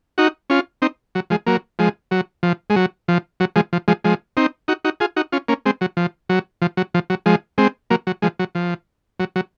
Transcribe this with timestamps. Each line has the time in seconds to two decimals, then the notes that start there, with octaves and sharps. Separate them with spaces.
0.18 D#4 F#4
0.50 C#4 F4
0.82 C4 D#4
1.15 F#3
1.30 F3 G#3
1.46 F#3 A#3
1.79 F3 G#3
2.11 F#3
2.43 F3
2.70 G#3
2.76 F#3
3.08 F3
3.40 F#3
3.56 F3 G#3
3.73 F3
3.88 F3 G#3
4.04 F3 G#3
4.37 C4 D#4
4.68 D#4 F#4
4.85 D#4 F#4
5.00 F4 G#4
5.16 D#4 F#4
5.32 C#4 F4
5.49 A#3 C#4
5.65 G#3 C4
5.81 F#3
5.97 F3
6.29 F#3
6.62 F3
6.77 F#3
6.94 F3
7.10 F#3
7.26 F3 G#3
7.58 G#3 C4
7.90 F#3 A#3
8.07 F#3
8.22 F3 G#3
8.39 F#3
8.55 F3
9.20 F#3
9.36 F#3